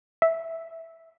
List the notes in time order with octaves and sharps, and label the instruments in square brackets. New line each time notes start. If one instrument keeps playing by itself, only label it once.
[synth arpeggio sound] E5